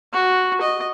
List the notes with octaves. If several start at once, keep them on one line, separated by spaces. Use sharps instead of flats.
F#4
D#5